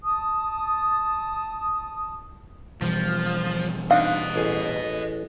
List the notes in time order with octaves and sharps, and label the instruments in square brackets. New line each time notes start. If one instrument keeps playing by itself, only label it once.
[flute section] A5 D#6
[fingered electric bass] B2 E3 G3 [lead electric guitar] F3
[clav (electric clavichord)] C4 D4 D#4 [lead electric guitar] D#5 F#5 [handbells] F5
[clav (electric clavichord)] A1 G#4